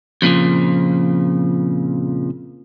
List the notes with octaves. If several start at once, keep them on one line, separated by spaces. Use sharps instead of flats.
F2 A#2 C#3 F3